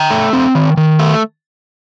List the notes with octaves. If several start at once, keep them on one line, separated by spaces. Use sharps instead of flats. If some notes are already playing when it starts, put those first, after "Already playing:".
Already playing: G5 A#5
A3
C4
D#3
D#3
A3